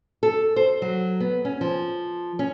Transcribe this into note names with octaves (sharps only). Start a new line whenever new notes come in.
A4
C5
F#3
B3
C#4
F3
C#4